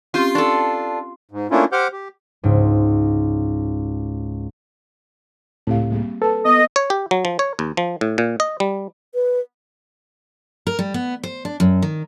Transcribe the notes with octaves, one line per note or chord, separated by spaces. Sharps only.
C4 C#4 F4 G4
D4 A4 C#6
G#2
A3 A#3 C#4 D4 E4 F4
G4 C5 F#5 D6 F6 G6
G4
C#2 G#2
C#2 A2 C4 G4 F5
G3 A#3 G#4
A4 B4 A5
B3 D#5
C#5
G4
F#3
F3
C#5
D#2
F3
A2
A#2
D#5
G3
B4
A#4
G3
B3
C5
D4
F#2
D#3